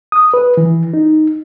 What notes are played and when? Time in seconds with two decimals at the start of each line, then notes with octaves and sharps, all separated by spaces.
0.12 D#6
0.34 B4
0.57 E3
0.94 D#4